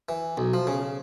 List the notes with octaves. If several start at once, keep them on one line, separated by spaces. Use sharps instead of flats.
E3
B1
F3
C#3